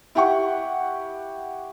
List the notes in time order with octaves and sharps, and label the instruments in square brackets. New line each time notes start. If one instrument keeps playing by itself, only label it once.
[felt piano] E4 G4 F#5 G5 C#6